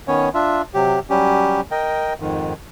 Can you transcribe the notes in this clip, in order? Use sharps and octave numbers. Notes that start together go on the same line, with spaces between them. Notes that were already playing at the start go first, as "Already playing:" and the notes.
D#3 B3 C#4 C#5
D4 F4 E5
C3 F#3 G4
F#3 G3 C#4 G4
A#4 D#5 G5
F2 G#2 D#3